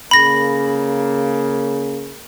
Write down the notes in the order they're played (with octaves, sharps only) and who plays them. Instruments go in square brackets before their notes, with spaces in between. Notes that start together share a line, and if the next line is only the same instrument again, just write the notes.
[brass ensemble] C#3 A#3 [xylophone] B5 A#6